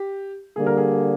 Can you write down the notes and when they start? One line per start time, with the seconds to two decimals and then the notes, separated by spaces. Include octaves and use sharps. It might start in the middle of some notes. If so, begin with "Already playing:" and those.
Already playing: G4
0.56 D3 G3 A#3 G#4
0.67 A#4
0.77 G#4